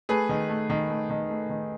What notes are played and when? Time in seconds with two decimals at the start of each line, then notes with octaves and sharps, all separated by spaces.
0.09 A3 G#4 B4
0.29 D#3
0.49 A3
0.70 D#3
0.90 A3
1.10 D#3
1.30 A3
1.50 D#3